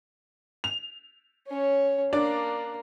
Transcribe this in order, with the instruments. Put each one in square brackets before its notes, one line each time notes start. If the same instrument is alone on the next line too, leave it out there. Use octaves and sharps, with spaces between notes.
[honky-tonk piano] F7
[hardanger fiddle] C#4 C#5
[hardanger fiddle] A#3 [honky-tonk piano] D4 D5